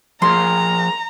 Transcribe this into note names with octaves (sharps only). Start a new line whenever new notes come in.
F3 G#4 A#4 A#5 C6